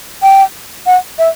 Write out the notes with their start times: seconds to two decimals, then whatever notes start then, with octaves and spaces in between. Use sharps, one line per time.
0.23 G5
0.86 F#5
1.19 E5